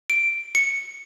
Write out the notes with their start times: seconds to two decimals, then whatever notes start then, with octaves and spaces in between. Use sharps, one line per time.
0.10 D7
0.55 C#7